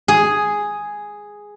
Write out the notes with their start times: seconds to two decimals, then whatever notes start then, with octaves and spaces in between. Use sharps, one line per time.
0.08 G#4